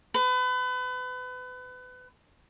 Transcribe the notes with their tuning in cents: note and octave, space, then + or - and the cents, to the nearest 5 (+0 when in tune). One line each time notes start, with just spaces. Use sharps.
B4 +30